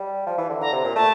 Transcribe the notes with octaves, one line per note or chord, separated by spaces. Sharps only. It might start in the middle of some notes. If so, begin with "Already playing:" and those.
Already playing: G3
F3
E3
D3
D3 A#5
C3
A#2
A3 A5